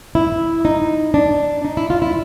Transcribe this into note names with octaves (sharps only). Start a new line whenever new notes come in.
E4
D#4
D4
D#4
E4
F4
E4